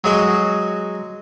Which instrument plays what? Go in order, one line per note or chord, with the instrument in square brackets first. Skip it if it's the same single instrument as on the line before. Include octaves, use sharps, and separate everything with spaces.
[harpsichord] F#3 G#3 F#4